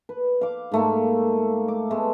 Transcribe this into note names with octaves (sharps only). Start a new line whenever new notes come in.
B4
F5 D6
G#2 A3 A#3
D6
G#3 A3 B3